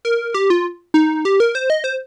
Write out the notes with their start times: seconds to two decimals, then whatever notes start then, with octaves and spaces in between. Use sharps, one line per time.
0.05 A#4
0.34 G4
0.50 F4
0.94 D#4
1.25 G4
1.40 A#4
1.55 C5
1.70 D#5
1.84 C5